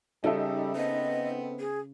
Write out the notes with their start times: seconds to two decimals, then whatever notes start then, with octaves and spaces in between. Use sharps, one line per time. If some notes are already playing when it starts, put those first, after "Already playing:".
0.24 C#3 G3 D#4 A4 E5
0.76 B3 C4 D#5
1.60 G#4